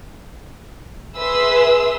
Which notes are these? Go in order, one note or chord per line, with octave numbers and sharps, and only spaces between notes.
G#4 B4 E5 C6 D#6 E6